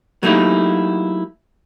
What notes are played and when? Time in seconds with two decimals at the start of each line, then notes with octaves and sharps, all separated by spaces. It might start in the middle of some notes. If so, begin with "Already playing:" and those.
0.23 F#3 A3 A#3 D#4 E4 G4